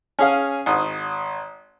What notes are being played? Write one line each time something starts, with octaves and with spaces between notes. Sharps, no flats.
C#4 G#4 F5
G#1 D#6